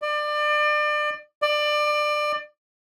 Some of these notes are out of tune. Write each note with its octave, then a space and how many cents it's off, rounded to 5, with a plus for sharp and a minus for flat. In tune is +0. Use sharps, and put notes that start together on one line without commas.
D5 +30
D5 +25